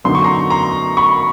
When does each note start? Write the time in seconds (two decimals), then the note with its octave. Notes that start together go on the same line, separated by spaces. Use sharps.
0.04 F#2 D3 F#3 B3 D#4 C6
0.15 C#6
0.24 A#5 C6
0.50 A#5 C6
0.97 B5 C#6